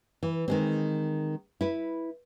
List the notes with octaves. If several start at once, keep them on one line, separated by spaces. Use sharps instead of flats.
E3
D#3 G#3 C4
E4 B4